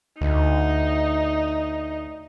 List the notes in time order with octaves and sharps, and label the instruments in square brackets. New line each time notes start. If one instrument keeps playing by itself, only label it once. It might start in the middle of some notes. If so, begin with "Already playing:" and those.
[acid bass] D2 [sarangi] D#4